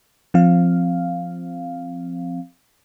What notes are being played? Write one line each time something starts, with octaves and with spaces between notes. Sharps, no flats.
F3 C4 F5